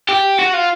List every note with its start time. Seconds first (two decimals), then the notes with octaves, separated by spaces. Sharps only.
0.09 G4
0.39 F#4
0.54 F4